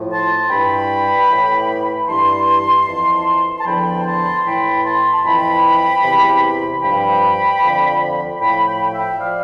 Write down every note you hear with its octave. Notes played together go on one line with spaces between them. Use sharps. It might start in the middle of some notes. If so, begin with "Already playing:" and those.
Already playing: A2 F3
A5 C6
G2 E3 G5 B5
A2 E3
G2 E3 A5 C6
F2 E3
A5
E2 D3 F3 G5 B5
A5 C6
A2 E3 G5 B5
A5 C6
A5
F2 E3 G5 B5
E2 C3 E3
G2 F3 G5 B5
F2 D3 F3
A2 F3 G5 B5
G5 B5
E5 G5
F3 D5 F5